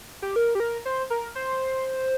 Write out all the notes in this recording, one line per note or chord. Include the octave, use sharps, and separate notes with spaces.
G4
A#4
G4
A#4
C5
A#4
C5